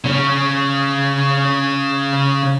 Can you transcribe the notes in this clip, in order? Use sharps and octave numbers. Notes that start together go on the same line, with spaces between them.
C#3 C#4